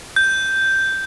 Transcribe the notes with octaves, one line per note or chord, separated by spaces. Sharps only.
G6